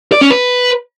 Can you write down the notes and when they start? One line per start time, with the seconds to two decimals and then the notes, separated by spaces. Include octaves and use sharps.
0.12 D5
0.21 C#4
0.30 B4